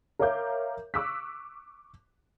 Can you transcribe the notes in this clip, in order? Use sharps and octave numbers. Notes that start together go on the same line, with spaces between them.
A#4 C#5 E5 F5 D6 G6
C#6 D6 E6 F#6 B6